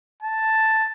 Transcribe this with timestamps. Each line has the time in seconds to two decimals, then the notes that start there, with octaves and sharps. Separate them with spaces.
0.23 A5